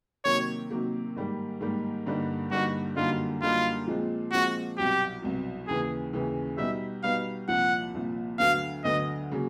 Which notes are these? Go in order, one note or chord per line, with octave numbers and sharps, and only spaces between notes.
C3 D#3 F#3 A#3 C#5
C3 D#3 F#3 A#3
G#2 D#3 G3 A#3
G#2 D#3 G3 A#3
G2 D3 G3 A#3 D#4
G2 D3 G3 A#3 D#4 F#4
F#2 D3 G3 A#3 D#4 F4
F#2 D3 G3 A#3 D#4 F4
A#2 F3 G#3 C4
A#2 F3 G#3 C4 F#4
C2 B2 F#3 G4
C2 B2 F#3
D#2 C#3 E3 G#4
D#2 C#3 E3
B2 G3 B3 D#4 E5
B2 G3 B3 D#4 F5
C2 A#2 F3 F#5
C2 A#2 F3
D2 D3 F#3 B3 F5
D2 D3 F#3 B3 D#5
C#3 F#3 A#3